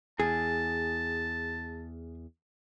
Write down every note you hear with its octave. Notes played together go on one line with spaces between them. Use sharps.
E2 G#4 A5